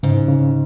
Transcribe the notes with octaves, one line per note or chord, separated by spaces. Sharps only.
G#2 C#3
C#3